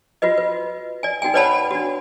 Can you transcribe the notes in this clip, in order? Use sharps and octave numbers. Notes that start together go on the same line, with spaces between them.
F4 F#4 B4 D#5
B4
D5 G#5
D#4 F#4 G5 G#5
B4 C#5 D5 F#5 A5 B5
D4 F#4